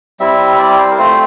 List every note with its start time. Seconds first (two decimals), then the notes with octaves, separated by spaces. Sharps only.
0.20 G3 C4 E4 E5
0.59 D5
0.78 C5
0.91 A#4
0.98 A3 C4 F4 C5